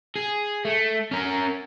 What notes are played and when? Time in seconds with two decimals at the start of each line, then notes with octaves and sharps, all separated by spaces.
0.16 G#4
0.65 A3
1.11 C#4 A#4